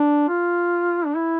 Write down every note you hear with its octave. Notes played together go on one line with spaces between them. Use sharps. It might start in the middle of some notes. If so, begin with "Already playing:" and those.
Already playing: D4
F4
D4
E4